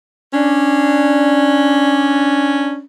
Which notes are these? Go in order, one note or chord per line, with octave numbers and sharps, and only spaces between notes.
C#4 D4